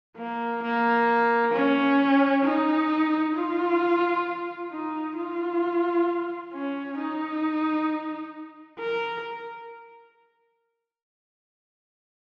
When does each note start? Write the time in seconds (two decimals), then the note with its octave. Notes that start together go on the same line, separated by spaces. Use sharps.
0.17 A#3
0.62 A#3
1.53 C#4
2.44 D#4
3.35 F4
4.72 D#4
5.17 F4
6.53 C#4
6.98 D#4
8.80 A#4